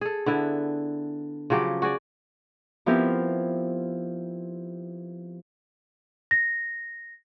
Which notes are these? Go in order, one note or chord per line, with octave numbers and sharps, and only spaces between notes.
G#4 A4
D3 B3 E4
C#3 F3 F#3 G4
F#4 G#4 D5
F3 B3 C4 E4 G4 A#4
A#6